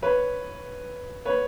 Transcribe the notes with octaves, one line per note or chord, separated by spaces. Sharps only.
B4 C#5
B4 C#5